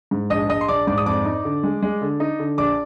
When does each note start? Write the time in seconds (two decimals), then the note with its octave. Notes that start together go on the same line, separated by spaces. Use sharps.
0.11 G#2
0.30 A#1 D#5 D#6
0.49 A#1 D#5 D#6
0.61 C6
0.68 A#1 D5 D6
0.87 G#2 D5 D6
0.97 D#6
1.06 F2 D5 D6
1.25 D#4
1.44 D3
1.63 G#3
1.82 G#3
2.01 D3
2.20 D#4
2.39 D3
2.58 A#1 D5 D6